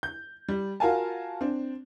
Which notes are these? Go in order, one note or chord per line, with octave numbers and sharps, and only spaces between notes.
G6
G3
F4 F#4 A#4 F5 G#5 A5
C4 D4